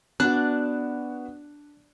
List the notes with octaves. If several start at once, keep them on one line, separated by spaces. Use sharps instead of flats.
B3 D4 F#4 F#6